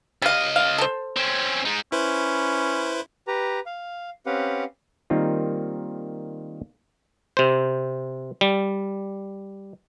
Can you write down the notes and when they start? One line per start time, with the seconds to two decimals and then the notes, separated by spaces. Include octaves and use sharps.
0.22 C#2 G3 D#5 F5
0.56 F5
0.78 A4 C5
1.17 C4 C#4
1.65 G#3 D#4
1.92 C#4 E4 B4 C5
3.27 G4 B4 A#5
3.66 F5
4.26 C4 C#4 G4 B4 F5 F#5
5.10 D#3 G3 A#3 C4 D#4 F4
7.37 C3 C5
8.41 G3